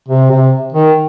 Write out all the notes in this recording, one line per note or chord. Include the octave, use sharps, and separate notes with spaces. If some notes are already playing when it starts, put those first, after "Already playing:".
C3
C3
D#3